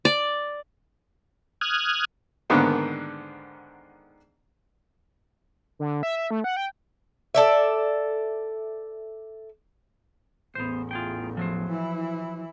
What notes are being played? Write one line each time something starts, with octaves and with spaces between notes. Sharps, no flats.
D5
D#6 F6 F#6 G#6
G#2 D3 D#3 A#3 B3 D4
D3
E5
E5
A3
F#5
G5
A4 D5 E5
A1 E2 B3 C5
F4 G#4 G5
F3 F#3 C5
E3 E4